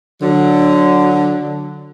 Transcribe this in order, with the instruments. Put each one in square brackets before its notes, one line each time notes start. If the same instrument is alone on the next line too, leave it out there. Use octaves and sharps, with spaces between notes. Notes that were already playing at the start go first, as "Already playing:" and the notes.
[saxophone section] D3 F#3